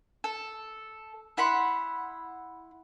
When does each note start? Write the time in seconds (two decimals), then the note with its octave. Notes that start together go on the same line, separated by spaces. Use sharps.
0.24 A4
1.37 E4 F#5 B5 C6